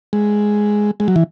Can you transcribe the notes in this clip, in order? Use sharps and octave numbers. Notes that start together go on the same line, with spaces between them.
G#3
G#3
F#3
E3